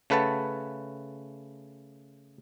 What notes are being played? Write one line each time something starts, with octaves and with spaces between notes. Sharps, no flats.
C#3 A3 B4 F#5 A5